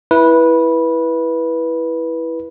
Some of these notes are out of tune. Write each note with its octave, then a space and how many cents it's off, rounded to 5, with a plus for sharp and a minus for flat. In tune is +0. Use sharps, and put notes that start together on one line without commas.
E4 +0 B4 -15